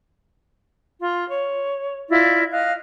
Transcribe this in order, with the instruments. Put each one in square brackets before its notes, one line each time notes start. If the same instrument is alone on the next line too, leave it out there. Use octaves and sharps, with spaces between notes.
[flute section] F4
C#5
E4 F4 D5 D#5
D#5 F5 F#6